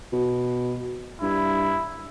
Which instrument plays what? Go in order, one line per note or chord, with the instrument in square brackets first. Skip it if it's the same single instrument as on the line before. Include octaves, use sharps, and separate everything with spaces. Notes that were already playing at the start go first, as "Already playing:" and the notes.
[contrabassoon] B2
[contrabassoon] G2 [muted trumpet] E4